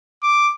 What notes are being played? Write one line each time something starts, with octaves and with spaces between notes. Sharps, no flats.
D6